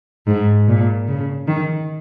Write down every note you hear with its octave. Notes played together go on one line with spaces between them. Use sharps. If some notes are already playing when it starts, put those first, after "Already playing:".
G#2
A#2
C#3
D#3